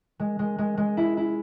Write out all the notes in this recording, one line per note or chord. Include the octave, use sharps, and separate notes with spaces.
G#3
G#3
G#3
G#3
E4
E4